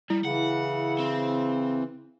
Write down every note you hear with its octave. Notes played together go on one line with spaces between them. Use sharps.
G3 E4
C#3 E3 F#5
C4